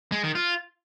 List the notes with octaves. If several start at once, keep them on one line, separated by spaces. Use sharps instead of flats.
G#3
D#3
F4